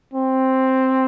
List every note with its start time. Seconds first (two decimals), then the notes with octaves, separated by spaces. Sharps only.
0.14 C4